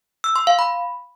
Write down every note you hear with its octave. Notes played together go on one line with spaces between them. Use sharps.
E6
C6
F5
B5